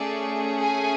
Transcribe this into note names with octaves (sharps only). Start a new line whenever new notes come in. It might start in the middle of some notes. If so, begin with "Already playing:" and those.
Already playing: A3 C#4 G#4 D5
G#5